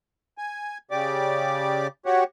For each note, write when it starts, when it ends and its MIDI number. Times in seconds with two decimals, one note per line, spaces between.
0.38 0.78 80
0.91 1.87 49
0.91 1.87 67
0.91 1.87 74
0.91 1.87 86
2.06 2.24 66
2.06 2.24 67
2.06 2.24 73
2.06 2.24 78